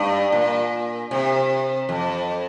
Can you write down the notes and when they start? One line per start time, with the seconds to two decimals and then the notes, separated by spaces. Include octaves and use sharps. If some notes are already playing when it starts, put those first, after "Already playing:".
Already playing: G2
0.32 A#2
1.11 C3
1.89 F2